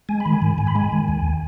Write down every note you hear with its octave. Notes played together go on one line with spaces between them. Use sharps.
G#3 G#5
B5
D#3
G#5
G#2
G#2 G#5
B5
G#3 G#5
D#3
D#2